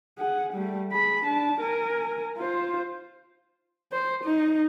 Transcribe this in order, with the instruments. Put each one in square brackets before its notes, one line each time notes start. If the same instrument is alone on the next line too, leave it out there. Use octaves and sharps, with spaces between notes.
[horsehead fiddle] G#4 F#5
G3 A3
G#4 B5
D4 A5
A#4 G#5
F4 C5
C5
D#4